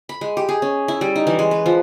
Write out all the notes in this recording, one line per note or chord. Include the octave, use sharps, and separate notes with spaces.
B5
G#3
G4
G#4
C#4
E4
G3
D#4
E3
G#3
B4
F3